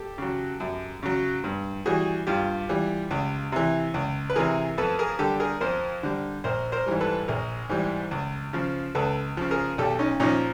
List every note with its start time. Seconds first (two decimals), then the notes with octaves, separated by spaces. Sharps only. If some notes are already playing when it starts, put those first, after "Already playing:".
Already playing: G4 A4
0.18 C#3 F#3
0.60 F#2
1.03 C#3 F#3
1.44 G2
1.86 E3 G3 F#4 G#4
2.27 G2 F4 G4
2.69 E3 G3
3.11 C#2
3.52 C3 E3
3.94 C#2
4.30 B4
4.36 C3 E3 G#4 A#4
4.78 F2 A4 B4
4.99 G#4 A#4
5.19 D3 G3 G4 A4
5.40 G#4 A#4
5.61 F2 A#4 C5
6.03 D3 G3
6.44 A#1 A#4 C5
6.72 A#4 C5
6.86 G#2 E3 G3
7.01 A4 B4
7.28 A#1 G#4 A#4
7.69 G#2 E3 G3
8.11 C#2
8.53 C#3 F3
8.95 C#2 A4 B4
9.37 C#3 F3
9.51 G#4 A#4
9.78 B1 G4 A4
9.99 C#4 D#4
10.20 A#2 F3 C#4 D#4